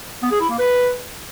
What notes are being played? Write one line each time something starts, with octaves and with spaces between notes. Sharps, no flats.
B3
G#4
E4
A#3
B4